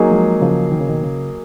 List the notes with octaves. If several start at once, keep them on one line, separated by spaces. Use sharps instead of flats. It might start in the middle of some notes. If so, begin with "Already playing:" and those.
Already playing: F#3 A#3 D#4 G#4
F3 G#3
C#3 F3
D#3
C#3
B2 D#3
C#3